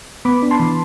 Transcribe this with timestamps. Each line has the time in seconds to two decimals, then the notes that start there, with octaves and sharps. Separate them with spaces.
0.25 B3 B5 D6
0.43 D4
0.51 A5 C6
0.60 E3